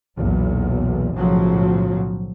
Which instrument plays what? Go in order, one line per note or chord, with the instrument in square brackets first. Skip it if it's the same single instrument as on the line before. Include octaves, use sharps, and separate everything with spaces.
[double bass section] B1 E2 A#2
B1 A2 C#3 F3 F#3